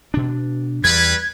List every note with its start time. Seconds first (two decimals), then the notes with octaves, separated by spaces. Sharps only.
0.14 B2 D4
0.84 E2 G3 B4 G#6